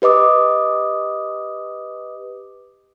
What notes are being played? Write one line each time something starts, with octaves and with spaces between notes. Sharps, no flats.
G4 B4 D#5 D6 D#6